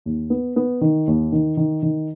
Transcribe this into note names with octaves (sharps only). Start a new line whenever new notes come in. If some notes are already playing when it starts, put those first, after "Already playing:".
D#2
B3
B3
D#3
D#2
D#3
D#3
D#3